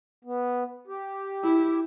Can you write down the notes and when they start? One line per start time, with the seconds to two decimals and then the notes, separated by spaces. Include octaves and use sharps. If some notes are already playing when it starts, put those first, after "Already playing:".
0.24 B3
0.87 G4
1.44 E4